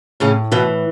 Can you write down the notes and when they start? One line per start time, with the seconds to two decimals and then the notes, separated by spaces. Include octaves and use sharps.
0.20 A2 C#3 C#4
0.52 B2 E3 B3